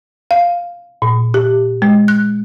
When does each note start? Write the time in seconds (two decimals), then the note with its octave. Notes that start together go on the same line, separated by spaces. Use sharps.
0.31 F5
1.02 A#2
1.34 G4
1.82 G#3
2.08 F#6